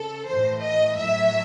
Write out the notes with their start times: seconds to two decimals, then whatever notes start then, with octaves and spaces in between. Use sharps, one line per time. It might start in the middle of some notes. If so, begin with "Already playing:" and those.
Already playing: C#3 A4
0.27 A2 E3 C5
0.62 D#5
0.98 A2 F#3 E5